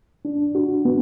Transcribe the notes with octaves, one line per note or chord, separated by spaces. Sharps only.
D4
F#4
B3